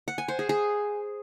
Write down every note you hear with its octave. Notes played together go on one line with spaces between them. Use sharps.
F#5
G#5
C5
G#4
G#4